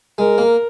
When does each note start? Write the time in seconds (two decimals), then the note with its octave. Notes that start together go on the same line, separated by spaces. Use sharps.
0.18 G#3 A#4
0.38 A#3